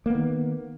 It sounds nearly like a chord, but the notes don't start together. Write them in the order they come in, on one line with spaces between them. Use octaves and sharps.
A#3 B3 D#3